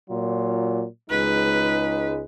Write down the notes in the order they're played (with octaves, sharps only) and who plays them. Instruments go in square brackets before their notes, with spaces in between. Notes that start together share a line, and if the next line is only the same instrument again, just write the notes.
[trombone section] A#2 F#3 F4
[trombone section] C#2 G#3 D#4 [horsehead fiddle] B4